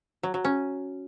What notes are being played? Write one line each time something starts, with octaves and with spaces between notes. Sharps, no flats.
F#3
F#3
C#4